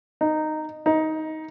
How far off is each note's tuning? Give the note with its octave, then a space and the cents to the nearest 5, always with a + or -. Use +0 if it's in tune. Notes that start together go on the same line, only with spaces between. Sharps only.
D#4 -10
D#4 +15